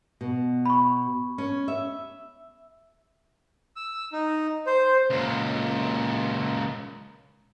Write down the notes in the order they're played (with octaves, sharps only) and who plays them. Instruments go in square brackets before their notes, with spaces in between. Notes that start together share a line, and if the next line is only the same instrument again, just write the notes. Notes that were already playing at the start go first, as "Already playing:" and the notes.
[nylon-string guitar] B2
[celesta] B5 C#6
[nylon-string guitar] C#4
E5
[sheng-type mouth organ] E6
D#4
C5
[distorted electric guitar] C#2 A#2